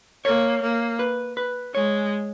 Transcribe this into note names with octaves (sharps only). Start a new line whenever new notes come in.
A#3 C#5
A#3
B4
B4
G#3 C#5